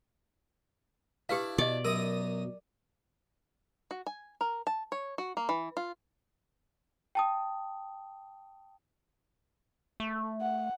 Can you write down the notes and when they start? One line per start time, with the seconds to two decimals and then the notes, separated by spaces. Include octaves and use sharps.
1.29 D4 E4 G4 B4 F5
1.58 B2 G4 D5 D#5
1.85 F#2 A#4 A#5 D#6
3.91 F#4
4.07 G#5
4.41 A#4
4.67 A5
4.92 C#5
5.18 F#4
5.37 A#3
5.49 E3
5.77 F4
7.15 G5 A5 D#6
10.00 A3
10.41 F#5